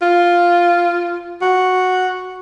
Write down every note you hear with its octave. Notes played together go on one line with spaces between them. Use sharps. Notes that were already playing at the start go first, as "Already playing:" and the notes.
F4
F#4